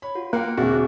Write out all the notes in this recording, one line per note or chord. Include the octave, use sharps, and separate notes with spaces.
C#5 B5
F4 F#4
A#3 A#4 F5 G5 F#6 C#7
E1 D3 C4 F#4 G#4 E5
D6